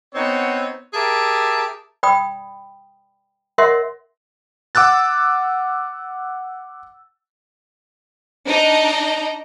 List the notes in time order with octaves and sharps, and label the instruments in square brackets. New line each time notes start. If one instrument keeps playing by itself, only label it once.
[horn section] B3 C4 D#4 C#5 F#5
G4 G#4 A#4 E5 A5
[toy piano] D5 G5 B5 D#6
A#4 C#5 D#5 E5 F#5 C6
[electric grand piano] F#5 D6 E6 F#6 A6
[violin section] D4 D#4 D#5 A#5